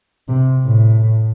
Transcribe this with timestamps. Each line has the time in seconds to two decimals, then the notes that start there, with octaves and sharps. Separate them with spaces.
0.28 C3
0.64 A2